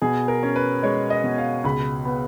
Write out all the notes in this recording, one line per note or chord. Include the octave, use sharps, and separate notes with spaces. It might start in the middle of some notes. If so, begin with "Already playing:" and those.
B2 G#4
A#4
C#4
B4
G#3 C#5
D#5
B2
F5
C#2 B5
B3